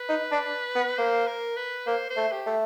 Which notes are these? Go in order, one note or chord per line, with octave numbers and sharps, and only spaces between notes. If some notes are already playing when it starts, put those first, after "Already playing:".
Already playing: B4
D#4
D4
B3
A#3 C5
A#4
B4
A#3 C5
C5
A3
G4
A3